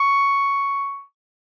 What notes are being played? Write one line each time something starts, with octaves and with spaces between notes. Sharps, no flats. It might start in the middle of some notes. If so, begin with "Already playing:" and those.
Already playing: C#6